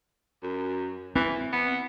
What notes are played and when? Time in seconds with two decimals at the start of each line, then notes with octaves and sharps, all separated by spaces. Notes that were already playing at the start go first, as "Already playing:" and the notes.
0.43 F#2
1.16 E3 C4
1.53 B3